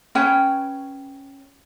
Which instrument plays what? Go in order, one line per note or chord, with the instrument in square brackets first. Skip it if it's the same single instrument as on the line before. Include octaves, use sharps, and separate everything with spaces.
[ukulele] C#4 B4 C#5 G5